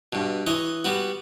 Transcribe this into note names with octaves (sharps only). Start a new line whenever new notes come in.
G2 B2
E3 C#5 D#5
G3 B3 F#4